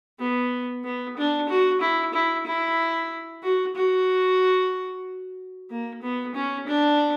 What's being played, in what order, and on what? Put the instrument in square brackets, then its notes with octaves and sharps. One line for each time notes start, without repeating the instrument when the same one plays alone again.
[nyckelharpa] B3
B3
D4
F#4
E4
E4
E4
F#4
F#4
A#3
B3
C#4
D4